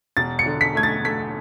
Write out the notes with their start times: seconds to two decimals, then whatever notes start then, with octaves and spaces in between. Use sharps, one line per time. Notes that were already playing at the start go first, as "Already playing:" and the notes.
0.17 E1 A6
0.39 C#7
0.46 D3
0.61 B6
0.75 A3 G#6
0.83 A6
1.05 A3 B6